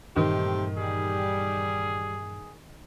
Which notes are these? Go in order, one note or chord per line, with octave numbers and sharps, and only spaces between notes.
G2 A#2 D#3 E3 A3 C4 G4
G3 G#4